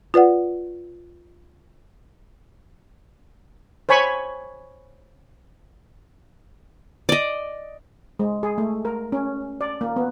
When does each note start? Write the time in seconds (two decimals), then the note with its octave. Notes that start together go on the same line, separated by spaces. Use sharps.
0.14 F4 B4 D5 F#5
3.89 C5 C#5 G#5 B5 C#6
7.09 D5 D#5
8.19 G#3
8.43 G#4
8.58 A3
8.85 A#4
9.12 C#4
9.61 D5
9.81 A#3
9.96 B3